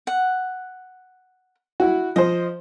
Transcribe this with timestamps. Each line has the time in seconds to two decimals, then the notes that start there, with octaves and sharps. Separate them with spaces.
0.07 F#5
1.80 E4 F#4
2.16 F3 C5 D#5